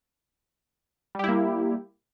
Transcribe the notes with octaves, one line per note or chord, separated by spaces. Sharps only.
G3 A#3 E4 G4